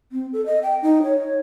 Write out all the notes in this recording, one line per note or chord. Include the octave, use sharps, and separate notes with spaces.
C4
A4
D#5
G5
D#4
C#5